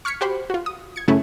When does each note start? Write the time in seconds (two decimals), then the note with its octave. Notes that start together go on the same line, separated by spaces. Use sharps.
0.05 C#6 F6 G#6 B6 C#7
0.21 F#4 G4 C5 G5 B5
0.50 F4 F#4
0.66 D#6
0.96 G#6 C#7
1.08 F#2 C#3 F#3 A3 C#4 E4